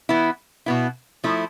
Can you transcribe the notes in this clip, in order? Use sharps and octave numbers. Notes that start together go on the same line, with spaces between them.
E3 B3 E4
B2 B3 E4
F3 A3 E4